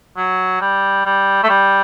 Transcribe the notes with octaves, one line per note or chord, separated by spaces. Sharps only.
F#3
G3
G3
A3
G3